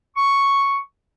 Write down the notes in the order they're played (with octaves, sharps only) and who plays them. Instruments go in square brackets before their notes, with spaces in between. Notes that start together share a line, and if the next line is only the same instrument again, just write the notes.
[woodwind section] C#6